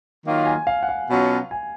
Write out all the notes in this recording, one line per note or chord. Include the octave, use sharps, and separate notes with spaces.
D#3 F#3 A#3 F4
G#5
F5
F#5
F5
B2 F#3 C#4 F4
G#5